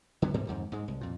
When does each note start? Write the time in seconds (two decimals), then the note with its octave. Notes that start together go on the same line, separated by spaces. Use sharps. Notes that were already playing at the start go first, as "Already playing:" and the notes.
0.22 D3 F#3 B3
0.34 G#2 C3 E3 G3
0.47 F2 G#2 D#3
0.72 G#2 G#3
0.88 C2
1.01 F2 A#2